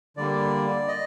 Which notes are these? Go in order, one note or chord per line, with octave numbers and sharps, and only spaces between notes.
D3 G3 A#3 D5
D#5